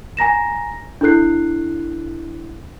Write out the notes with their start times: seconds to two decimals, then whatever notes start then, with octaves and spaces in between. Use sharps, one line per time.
0.17 G#5 A#5 A#6 E7
1.01 D4 E4 A4 F#6 C7